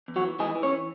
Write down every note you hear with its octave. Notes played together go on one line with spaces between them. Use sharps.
E2
F#3 F#4
E3
E3 G#3 G#4
E3
C#4 C#5
E3